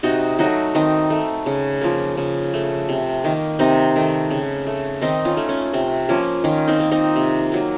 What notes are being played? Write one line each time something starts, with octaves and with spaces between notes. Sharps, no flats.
C3 D#4 F#4
F#3 A3 D#4 F#4
D#3 C4 D#4
A3
C#3
F3 A#3
C#3
A3
C3
D#3 A#3
C3 C4 D#4
D#3 A3
C#3
A3
D#3 C4 D#4
C#4 F4
A3
C#4
C3 C4
F3 A#3 C#4
D#3 C#4 F4
C4 D#4
A#3
C4 D#4
C3
F#3 A#3